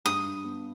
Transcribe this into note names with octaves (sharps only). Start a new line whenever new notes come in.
G2 D#6
G2
B3